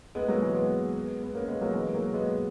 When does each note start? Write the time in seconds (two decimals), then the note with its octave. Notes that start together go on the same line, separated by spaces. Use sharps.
0.15 G#3 B3
0.28 F#3 A#3
0.42 E3 G#3
0.55 G#3 B3
1.23 B3
1.34 A#3 C#4
1.48 G#3 B3
1.61 F#3 A#3
1.74 E3 G#3
1.94 F#3 A#3
2.14 G#3 B3